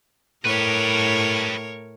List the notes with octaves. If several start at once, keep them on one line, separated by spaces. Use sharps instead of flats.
A2 G4 A#4 B4 C#5